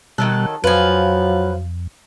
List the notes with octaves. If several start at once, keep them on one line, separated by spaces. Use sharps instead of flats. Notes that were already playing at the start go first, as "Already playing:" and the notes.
B2 D#3 F#3 G3 A4 F#6
F2 F3 F#3 F4 B4 G#5